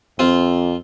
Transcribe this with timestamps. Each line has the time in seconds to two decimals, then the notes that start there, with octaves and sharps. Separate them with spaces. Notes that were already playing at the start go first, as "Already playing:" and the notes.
0.19 F2 C4 F4